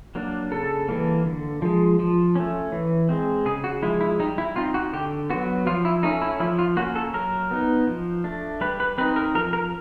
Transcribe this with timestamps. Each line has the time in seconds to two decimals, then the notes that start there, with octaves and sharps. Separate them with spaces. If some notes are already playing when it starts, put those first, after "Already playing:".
0.15 F#3 A#3 D4
0.51 C#3 A4
0.89 E3 G3 A#3
1.25 D3
1.62 F3 G#3
1.99 F3
2.36 A3 C#4
2.72 E3
3.09 G#3 C4
3.45 C#3 G#4
3.64 F#4
3.82 F3 G#3 E4
4.01 E4
4.20 G3 D#4
4.38 E4
4.56 C4 D#4 F4
4.74 F#4
4.93 D3 G4
5.30 F#3 B3 F#4
5.67 F3 F4
5.85 E4
6.03 A3 C#4 D#4
6.22 E4
6.40 F3 E4
6.59 F4
6.77 A#3 C#4 F#4
6.95 A4
7.14 F#3 A#4
7.51 B3 D#4
7.87 F3
8.24 A3 D4
8.61 G3 B4
8.80 B4
8.98 C4 D#4 B4
9.16 A#4
9.34 F3 A#4
9.53 A#4